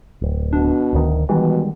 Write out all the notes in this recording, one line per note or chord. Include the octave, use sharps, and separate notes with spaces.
D1
B2 D4
D1 D2 D#3
B2 D#3 E3 G3 G#3